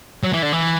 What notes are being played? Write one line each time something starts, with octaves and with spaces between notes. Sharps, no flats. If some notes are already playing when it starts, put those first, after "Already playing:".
F#3
E3
D3
E3